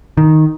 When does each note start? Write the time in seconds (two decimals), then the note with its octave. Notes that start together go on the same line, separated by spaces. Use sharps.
0.17 D#3